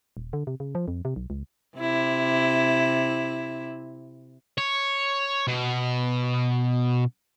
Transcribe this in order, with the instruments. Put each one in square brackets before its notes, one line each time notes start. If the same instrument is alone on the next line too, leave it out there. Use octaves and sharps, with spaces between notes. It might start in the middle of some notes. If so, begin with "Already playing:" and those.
[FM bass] D#1
D3
C3
C#3
F3
F2
C3
B1
C#2
[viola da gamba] C3 E4
[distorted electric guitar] C#5
B2